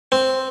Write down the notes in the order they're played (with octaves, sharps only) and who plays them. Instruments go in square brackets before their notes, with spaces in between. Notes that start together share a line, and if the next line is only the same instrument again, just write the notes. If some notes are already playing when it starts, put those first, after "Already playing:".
[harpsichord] C4